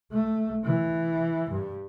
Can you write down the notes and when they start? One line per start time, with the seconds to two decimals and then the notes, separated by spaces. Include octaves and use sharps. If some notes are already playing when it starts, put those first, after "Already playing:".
0.12 A3
0.65 E3
1.51 G2